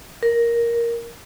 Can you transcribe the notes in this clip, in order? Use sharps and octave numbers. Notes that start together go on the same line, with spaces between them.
A#4